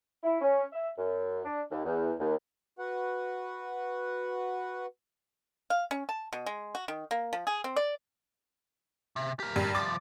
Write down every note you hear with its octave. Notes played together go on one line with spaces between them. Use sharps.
E4
C#4
E5
F#2
D4
D#2
E2
D#2
F#4 B4 F#5
F5
C#4
A5
B2
G#3
F#4
D#3
A#3
F3
G#4
C4
D5
C3
G4 A#4
G2
C2 F3 D6 A6